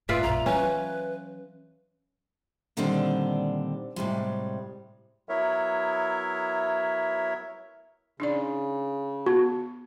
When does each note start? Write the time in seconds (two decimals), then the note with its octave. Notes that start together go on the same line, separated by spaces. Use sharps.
0.09 G#2 C#3 F4 B4 D5 E5
0.23 A#1 F#2 A#5
0.46 E3 F#3 C#4 B4
2.77 A#2 D3 D#3 G3 C4 D4
3.96 A2 C3 G3 G#3
5.29 F#3 B3 E4 A#4 C#5 E5
8.20 C#3 D4 D#4 D5
9.26 B3 F#4